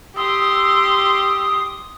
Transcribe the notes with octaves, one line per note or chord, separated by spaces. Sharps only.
G4 C6 D#6 E6